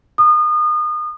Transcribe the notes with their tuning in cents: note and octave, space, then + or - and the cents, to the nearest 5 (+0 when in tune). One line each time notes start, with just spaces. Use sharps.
D#6 -30